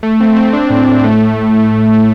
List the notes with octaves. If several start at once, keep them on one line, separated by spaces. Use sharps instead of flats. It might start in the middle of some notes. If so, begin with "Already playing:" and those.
A3
C4
C4
D4
A2
A2
A3